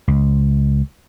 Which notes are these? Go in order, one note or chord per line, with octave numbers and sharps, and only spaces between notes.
C#2